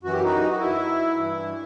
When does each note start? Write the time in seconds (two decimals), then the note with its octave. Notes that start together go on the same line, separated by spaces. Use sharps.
0.03 F#2 E3 F#4
0.13 G4
0.23 D#4 F#4
0.49 F#4
0.59 E4
1.15 G2 E3